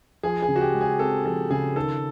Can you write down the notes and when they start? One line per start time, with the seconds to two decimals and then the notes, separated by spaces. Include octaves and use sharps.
0.23 F3 G#4
0.42 G#4
0.48 C#3
0.56 F#4
0.61 G4
0.74 G#3
0.81 G#4
0.99 C4 A4
1.25 F3 A4
1.51 C#3 G#4
1.76 D#3 A4